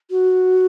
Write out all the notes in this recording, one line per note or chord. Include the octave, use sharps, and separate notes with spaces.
F#4